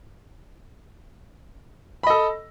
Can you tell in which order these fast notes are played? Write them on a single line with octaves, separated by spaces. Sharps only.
B5 D#5 A4